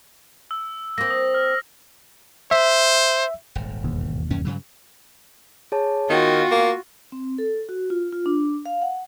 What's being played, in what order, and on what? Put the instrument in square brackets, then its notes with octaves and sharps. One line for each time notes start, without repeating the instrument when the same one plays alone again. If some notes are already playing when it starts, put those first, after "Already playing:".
[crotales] E6
[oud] A#3 C4 [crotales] A#6
[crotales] D#6
F6
[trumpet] C5 [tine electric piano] E5
[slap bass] D#1 G#1
[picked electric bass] E1 D#2
[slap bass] F#2 C#4
G2 C#3 F#3
[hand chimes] G#4 C#5 A5
[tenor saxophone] D#3 [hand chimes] B3 G5 [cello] F4 F#4
[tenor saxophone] A#3
[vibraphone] C4
A4
F#4
F4
F4
D4
F5
F#5